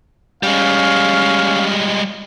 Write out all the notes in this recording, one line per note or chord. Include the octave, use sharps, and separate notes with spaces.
G3 G#3 C#4 F5